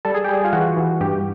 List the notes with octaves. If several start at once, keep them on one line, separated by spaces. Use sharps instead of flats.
G3 A4
G#4
G3 G4
G#4
F4
E3 F#4
E3
G2 G4